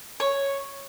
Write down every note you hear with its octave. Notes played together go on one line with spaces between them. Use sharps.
C#5